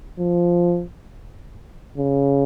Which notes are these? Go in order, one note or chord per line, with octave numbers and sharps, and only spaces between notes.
F3
C#3